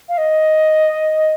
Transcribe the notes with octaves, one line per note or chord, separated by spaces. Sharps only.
F5
D#5